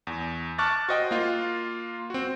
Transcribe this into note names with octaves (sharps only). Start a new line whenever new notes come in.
E2
A5 C#6 D6 F6 F#6 A6
F#4 C5 D#5 G5
A#3 F4
C4 F#4